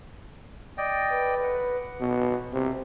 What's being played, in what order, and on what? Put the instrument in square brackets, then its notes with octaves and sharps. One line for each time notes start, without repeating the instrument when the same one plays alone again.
[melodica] D5 D#5 G5
[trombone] B4
[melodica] F#5
[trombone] B2
C3